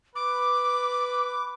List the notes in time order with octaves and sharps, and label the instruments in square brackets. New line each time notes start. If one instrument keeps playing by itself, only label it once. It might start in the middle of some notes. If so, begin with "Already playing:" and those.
[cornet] B4 [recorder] D6